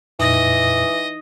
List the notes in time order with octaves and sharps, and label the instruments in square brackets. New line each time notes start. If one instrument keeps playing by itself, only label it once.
[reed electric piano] F2 A#2 [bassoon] E3 [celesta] D#4 D#6 A#6 [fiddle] D#5